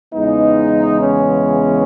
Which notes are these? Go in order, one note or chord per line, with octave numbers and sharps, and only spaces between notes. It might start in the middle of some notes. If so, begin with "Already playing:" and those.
E2 C#3 E3 G#3 B3 D#4
C#4